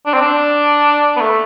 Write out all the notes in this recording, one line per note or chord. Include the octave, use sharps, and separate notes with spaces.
D4
C4
D4
B3
A3